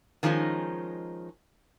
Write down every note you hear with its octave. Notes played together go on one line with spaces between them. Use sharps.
D#3 F3 G#3 C#4 D#4